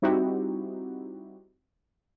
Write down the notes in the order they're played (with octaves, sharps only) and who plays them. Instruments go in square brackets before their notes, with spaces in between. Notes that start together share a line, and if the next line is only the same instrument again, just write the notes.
[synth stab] G3 C4 D#4 E4 F#4 G4